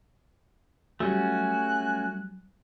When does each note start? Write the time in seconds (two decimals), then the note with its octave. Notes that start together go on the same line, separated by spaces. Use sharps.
1.00 F#3 G3 A3 C#4 F#4 G#5 F#6